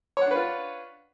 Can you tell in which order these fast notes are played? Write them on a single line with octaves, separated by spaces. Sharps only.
C#5 F#5 D4 B4 F4